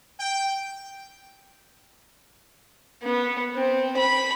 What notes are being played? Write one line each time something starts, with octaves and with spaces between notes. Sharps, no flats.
G5
B3
C4
B5